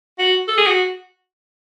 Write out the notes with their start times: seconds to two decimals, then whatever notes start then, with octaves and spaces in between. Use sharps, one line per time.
0.19 F#4
0.48 A4
0.58 G#4
0.67 F#4